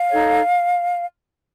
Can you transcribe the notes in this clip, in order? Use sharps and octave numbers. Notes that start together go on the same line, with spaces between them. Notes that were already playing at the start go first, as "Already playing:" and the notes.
Already playing: F5
D#4 A4 C#5